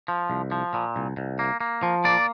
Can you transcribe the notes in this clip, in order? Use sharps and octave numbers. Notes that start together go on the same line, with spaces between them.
F3
C2
F3
A#2
C2
C2
A#3
A#3
F3
A#3 D5